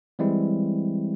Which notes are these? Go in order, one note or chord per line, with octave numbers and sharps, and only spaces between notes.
E3 G3 G#3 C4 E4